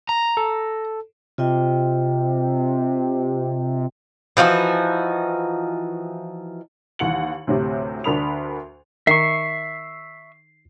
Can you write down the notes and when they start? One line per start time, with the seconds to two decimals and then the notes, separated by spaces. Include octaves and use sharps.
0.09 A#5
0.37 A4
1.38 C3 F4 D#5 G5
4.37 E3 F3 D#4 F#4
6.99 D#2 E3 F#5 C#7 F#7
7.47 D2 A2 C3
8.04 D2 D4 A#4 B5 D#6 F7
9.07 D#3 E5 C#6 C7